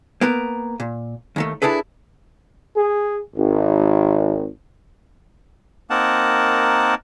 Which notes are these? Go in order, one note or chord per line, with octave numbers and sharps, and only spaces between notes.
A#3 B3 A#4
A#2
D#2 D#3 A3
D4 E4 G#4 A4 B4
G#4
G#1
A#3 C4 D#4 A#4 F#5 A5